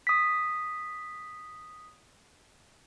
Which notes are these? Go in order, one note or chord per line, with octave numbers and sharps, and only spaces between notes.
D#6 B6